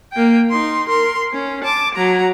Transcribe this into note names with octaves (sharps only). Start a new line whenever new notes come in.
A#3 G5
D#4 C6
A#4 C6
C#4
A5 D6
F#3 A#5